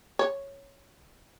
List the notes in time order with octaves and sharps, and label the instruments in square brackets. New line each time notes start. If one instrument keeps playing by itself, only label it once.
[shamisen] C#5